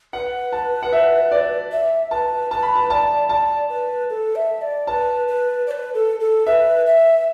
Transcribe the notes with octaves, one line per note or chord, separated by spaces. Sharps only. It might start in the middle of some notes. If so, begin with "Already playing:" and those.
B4 F#5
A5
F#5
E5
D5
E5
B4 A5
B4 A5
B5
A5
D5 A5
D5 A5
B4
A4
E5
D5
B4 A5
B4
D5
B4
A4
A4
B4 E5
E5